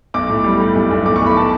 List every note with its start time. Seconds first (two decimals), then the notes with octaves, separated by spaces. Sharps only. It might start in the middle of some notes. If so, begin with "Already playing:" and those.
0.14 B1 D6
0.29 A2
0.44 G3
0.60 G3
0.75 B1
0.91 B1
1.05 A2 D6
1.16 C#6
1.21 B1
1.26 B5
1.37 A5